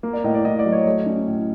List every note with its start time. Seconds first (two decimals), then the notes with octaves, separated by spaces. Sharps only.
0.03 A#3
0.13 D5
0.24 A2 D#5
0.34 D5
0.45 A2 D#5
0.59 D5
0.66 F#3
0.72 C#5
0.86 A3
1.06 C#4
1.27 A2